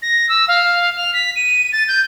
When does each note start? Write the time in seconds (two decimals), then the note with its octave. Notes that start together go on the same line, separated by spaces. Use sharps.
0.02 A#6
0.29 E6
0.48 F5
0.97 F7
1.14 B6
1.36 D#7
1.72 A6
1.88 G6